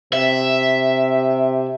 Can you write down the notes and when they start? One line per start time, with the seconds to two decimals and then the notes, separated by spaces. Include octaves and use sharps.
0.13 C3 E5